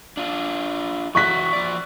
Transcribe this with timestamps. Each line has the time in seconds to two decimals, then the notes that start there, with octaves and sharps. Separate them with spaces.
0.17 D4 F4
1.15 E3 F#4 C#6 F#6 B6
1.53 F3 D5